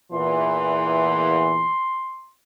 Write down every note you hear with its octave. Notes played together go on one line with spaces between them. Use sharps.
E2 A#2 E3 C6